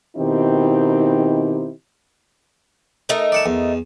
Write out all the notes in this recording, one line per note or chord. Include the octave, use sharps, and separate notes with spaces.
B2 D#3 C4 D#4 E4 G4
A3 D#4 A#4
D5 F#5 A5
E2